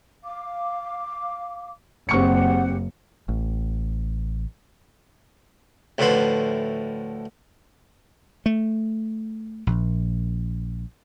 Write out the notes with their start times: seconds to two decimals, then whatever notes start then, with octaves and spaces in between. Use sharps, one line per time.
0.24 F5 D6
2.09 F#1 C4 G4 F#5 C#6 C#7
3.29 A1
5.98 D2 A2 D3 F3 B4 C6
8.46 A3
9.67 A#1